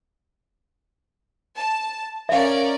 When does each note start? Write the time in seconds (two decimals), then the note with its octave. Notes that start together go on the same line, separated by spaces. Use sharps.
1.57 A5
2.29 C#4 A#4 D5 E5 F5